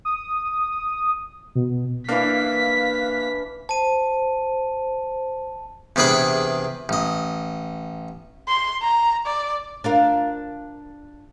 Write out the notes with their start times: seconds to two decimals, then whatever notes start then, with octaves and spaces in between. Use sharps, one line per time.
0.05 D#6
1.55 B2
2.09 E3 A#3 D4 F5 B6
3.69 C5 A5 D#7
5.96 E2 C3 D4 G#4 B4 B5
6.89 A1 D#5
8.48 C6
8.82 A#5
9.26 D5
9.84 D4 F4 A#4